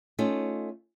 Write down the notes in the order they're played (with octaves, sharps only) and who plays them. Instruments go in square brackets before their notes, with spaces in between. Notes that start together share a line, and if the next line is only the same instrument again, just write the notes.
[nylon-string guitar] A3 C#4 D#4 F4